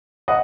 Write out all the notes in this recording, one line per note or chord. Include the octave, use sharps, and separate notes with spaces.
D#5 F#5